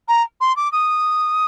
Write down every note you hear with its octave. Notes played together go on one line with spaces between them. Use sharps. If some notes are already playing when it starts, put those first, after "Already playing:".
A#5
C6
D6
D#6